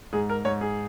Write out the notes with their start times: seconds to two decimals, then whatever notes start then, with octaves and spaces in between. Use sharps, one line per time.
0.13 G#2 G#4
0.30 A#4
0.45 G#2 C#5
0.61 G#4